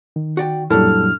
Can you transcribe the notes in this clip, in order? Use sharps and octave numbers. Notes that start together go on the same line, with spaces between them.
D#3
F#4 D5 G5
F#2 A#2 F#3 G3 D4 E4 A4 F6